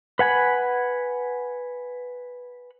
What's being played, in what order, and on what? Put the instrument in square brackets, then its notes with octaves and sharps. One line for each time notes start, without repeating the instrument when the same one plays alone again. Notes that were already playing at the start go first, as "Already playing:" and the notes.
[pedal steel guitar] B4 F#5 G#5 B5